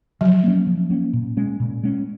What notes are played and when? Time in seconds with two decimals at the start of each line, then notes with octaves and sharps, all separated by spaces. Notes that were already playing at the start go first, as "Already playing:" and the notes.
0.21 F3 F#3
0.44 A#3 C#4
0.67 F3
0.90 A#3 C#4
1.13 A#2
1.37 G#3 C#4
1.60 A#2
1.83 G#3 C#4